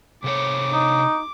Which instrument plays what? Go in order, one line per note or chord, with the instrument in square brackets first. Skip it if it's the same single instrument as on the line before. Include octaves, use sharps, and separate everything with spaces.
[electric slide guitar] C3 A4 C#5 [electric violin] D6
[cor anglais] D#4